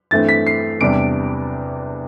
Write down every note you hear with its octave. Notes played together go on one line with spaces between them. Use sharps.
G2 E3 A3 C4 A6
B6
C7
E2 C3 G3 D4 D7